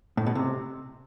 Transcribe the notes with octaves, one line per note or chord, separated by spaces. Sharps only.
A2
B2
C3